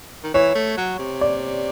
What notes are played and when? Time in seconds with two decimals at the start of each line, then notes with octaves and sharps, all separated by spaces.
0.24 D#3
0.34 E3 C#5
0.55 A3
0.77 F#3
0.99 C3
1.21 D5